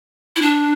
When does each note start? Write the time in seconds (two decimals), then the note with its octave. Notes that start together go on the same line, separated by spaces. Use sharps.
0.36 E4
0.42 D4